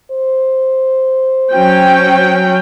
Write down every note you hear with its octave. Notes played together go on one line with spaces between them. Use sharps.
C5
F#3 C#4 G5